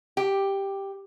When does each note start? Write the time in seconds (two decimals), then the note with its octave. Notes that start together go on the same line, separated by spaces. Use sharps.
0.17 G4